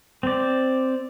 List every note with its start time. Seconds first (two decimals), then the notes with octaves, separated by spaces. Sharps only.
0.23 C4 D5